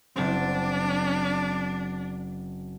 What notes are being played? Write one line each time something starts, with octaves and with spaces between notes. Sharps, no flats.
F#1 C4 D4